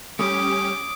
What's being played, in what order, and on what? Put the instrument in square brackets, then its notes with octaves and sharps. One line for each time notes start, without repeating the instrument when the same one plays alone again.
[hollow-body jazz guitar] G3 A3 [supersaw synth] C#4 G4 [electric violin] D6 [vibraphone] D#6